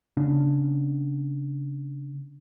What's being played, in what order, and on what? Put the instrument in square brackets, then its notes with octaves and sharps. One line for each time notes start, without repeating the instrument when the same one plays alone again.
[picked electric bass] C#3 B3 C#4 D4